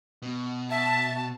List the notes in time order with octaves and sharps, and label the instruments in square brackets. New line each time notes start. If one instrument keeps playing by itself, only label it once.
[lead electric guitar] B2
[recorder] E5 [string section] A5